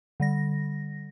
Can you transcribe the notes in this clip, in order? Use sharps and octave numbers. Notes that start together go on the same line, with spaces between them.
D3 G3 A#6